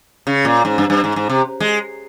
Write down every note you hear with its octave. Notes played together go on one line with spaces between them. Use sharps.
C#3
A#2
G#2
G2
G2
G#2
G#2
C3
G#3